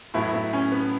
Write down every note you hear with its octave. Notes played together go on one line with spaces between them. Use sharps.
A2 F#3 B3 E4
B3 E4
C#4
B3